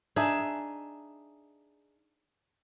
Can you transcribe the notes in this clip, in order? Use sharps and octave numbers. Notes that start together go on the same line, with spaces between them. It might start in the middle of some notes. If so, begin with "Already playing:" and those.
D4 D#4 G#4 E5